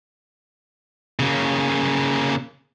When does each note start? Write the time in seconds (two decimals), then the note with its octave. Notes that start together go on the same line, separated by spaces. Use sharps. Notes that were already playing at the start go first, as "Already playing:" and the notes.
1.19 C#3 A#3